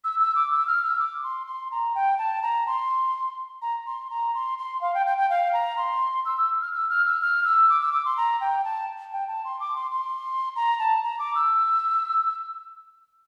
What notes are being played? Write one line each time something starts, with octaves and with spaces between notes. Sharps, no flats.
E6
E6
D6
E6
F6
E6
D6
C6
C6
A#5
G5
A5
A#5
C6
A#5
C6
A#5
C6
C6
F5
G5
G5
G5
F5
A#5
C6
E6
E6
F6
E6
F6
E6
F6
E6
D6
E6
D6
C6
A#5
G5
A5
G5
A5
C6
D6
C6
C6
A#5
A5
A#5
D6
E6